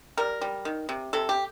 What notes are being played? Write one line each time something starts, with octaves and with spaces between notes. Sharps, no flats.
G3 A#4
G3
D#3
C3
C3 A4
G4